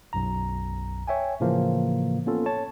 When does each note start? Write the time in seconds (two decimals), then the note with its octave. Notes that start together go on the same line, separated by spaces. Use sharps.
0.13 B1 F#2 A#5
1.08 C#5 E5 G5 G#5
1.40 A2 C#3 E3 F3 A#3
2.26 A#3 B3 C#4 F4 A4
2.46 C#5 A5